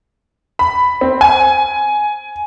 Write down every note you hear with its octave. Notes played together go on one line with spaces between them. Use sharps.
B5
C4
G#5